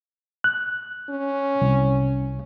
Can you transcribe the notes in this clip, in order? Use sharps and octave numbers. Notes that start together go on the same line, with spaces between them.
F#6
C#4
C2